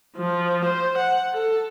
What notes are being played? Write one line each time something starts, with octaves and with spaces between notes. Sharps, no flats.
F3
C5
F#5
A4